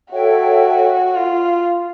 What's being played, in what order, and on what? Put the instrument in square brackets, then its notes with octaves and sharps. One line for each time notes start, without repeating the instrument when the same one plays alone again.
[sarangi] F#4 [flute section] A4 C#5 E5 G5
[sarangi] F4